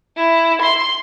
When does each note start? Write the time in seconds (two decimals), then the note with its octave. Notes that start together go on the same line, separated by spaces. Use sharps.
0.17 E4
0.62 C6